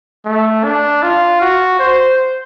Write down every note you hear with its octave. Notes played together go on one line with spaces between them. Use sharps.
A3
D4
F4
F#4
C5